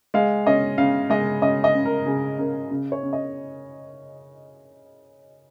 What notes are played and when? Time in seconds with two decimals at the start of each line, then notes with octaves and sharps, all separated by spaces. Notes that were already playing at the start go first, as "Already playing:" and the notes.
0.14 G#3 F5
0.46 C#4 D#5
0.78 C#3 F5
1.10 G#3 D#5
1.42 C#4 D#5
1.64 D#5
1.75 C#3
1.85 A#4
2.06 C#3 G#4
2.39 C#3 A#4
2.71 C#3
2.92 C#5
3.03 C#3
3.13 D#5